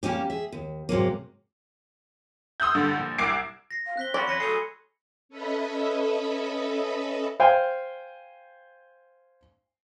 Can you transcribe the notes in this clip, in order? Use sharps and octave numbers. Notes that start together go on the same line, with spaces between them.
G3 A#3 C#4 D#4 G4
G#4 E5
D#2
G#2 C3 F#3 A#3
C6 D#6 E6 F#6 G6
G2 D3 A6
A#1
C2 D6 E6 G#6 C7 D7
A#6 C7
F5
C4 F#6 B6 G7
C#4 E4 F#4 D5 B5 C6
F2 B4 C#5 G#6 A#6 C#7
F#3 G#4 A4 C#7
C#4 A4 B4 D#5 E5 B5
C5 F5 G5 G#5